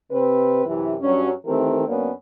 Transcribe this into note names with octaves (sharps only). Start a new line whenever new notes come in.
C3 C4 B4
F#2 C3 E3
G2 F#3 C#4
D#3 E3 A3 C4 G4 A#4
F#2 A#3 B3 C#4 D4